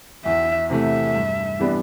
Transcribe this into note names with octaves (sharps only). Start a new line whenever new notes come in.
E2 E5
C3 E3 A3 E5
G2
E3 G3 B3 D4